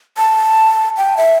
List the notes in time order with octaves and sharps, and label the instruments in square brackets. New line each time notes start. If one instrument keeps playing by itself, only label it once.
[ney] A5
G5
E5